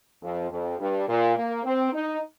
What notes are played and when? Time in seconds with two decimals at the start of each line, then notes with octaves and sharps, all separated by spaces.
0.22 F2
0.50 F2
0.79 G2
1.08 A#2
1.36 A#3
1.64 C4
1.93 D#4